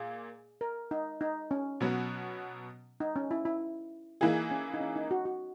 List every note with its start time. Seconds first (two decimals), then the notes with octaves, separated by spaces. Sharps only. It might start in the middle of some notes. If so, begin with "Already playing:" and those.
Already playing: A#2 A#3 G#4
0.61 A#4
0.91 D#4
1.21 D#4
1.51 C#4
1.81 B2 F#3 B3 F#4
3.00 D#4
3.16 C#4
3.31 E4
3.45 E4
4.21 E3 A#3 D#4 E4 G#4
4.51 C#4
4.74 D#4
4.81 C#4
4.96 D#4
5.11 F#4
5.25 F#4